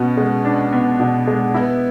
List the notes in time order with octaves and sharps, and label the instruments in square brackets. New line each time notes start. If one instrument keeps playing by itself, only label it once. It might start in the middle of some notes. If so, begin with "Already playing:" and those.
Already playing: [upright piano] B2 B3 [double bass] C#4
[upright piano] G#3
D4
B3
B2
G#3
[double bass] B3 [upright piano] E4